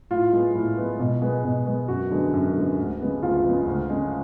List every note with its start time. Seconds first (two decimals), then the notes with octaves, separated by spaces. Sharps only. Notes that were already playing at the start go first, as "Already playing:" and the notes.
0.11 A2 F4
0.33 G#3 B3
0.55 A2
0.77 G#3 B3
0.99 B2
1.22 G#3 B3
1.44 B2
1.66 G#3 B3
1.88 F#2 F#4
2.11 D3 G#3 B3
2.33 F#2
2.56 D3 G#3 B3
2.78 D2
3.00 C#3 G#3 B3
3.22 D2 F4
3.45 C#3 G#3 B3
3.66 D2
3.90 C#3 G#3